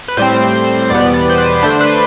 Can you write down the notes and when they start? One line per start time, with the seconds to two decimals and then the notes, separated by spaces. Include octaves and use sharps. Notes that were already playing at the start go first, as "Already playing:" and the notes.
0.08 B4
0.17 A2 G3 C4 C5
0.90 E2 B2 G3 B3 D5
1.14 D5
1.30 C5
1.38 B4
1.63 D3 A3 D4 C5
1.81 B4